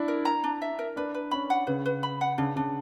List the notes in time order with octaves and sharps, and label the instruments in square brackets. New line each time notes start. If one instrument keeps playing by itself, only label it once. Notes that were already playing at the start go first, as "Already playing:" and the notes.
Already playing: [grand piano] D4 E4
[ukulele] A#4
A#5
D4
E5
A#4
[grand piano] D4 [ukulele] B4
[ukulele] B4
[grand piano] C#4 [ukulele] B5
[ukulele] F#5
[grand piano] C#3 [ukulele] B4
[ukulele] B4
B5
F#5
[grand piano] C#3 [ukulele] D4
[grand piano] C#3 [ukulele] D4